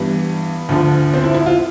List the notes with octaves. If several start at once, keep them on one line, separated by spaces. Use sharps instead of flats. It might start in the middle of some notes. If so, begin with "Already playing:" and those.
Already playing: G2 E3 G3 B3
D2 D3 F3
C4
E4
E4
F4